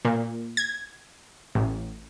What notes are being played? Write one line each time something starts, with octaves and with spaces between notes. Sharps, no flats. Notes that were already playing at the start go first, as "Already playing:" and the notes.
A#2
G#6
A1